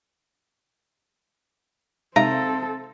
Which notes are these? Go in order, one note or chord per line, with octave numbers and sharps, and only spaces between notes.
C3 G#3 C4 D#4 A4 E5 F5 A#5